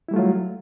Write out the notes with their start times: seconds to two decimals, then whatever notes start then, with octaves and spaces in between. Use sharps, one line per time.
0.08 E4
0.11 G3
0.14 A3
0.16 F4
0.19 F#3